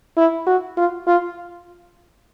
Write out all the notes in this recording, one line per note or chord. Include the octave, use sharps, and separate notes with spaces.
E4
F#4
F4
F4